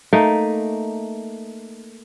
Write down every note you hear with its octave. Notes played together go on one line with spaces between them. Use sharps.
A3 A#3 D#4